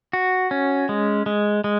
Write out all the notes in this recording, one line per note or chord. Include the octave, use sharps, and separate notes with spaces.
F#4
C#4
G#3
G#3
G#3